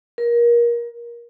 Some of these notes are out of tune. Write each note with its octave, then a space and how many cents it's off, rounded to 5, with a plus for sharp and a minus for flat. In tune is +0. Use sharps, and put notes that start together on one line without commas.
A#4 +25